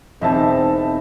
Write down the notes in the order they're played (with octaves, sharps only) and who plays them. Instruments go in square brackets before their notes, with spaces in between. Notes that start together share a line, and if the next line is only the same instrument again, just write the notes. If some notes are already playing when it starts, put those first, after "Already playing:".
[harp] E1 D#4 [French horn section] C4 [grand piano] D#5 E5 A5